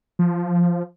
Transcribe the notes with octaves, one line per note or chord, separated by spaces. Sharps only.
F3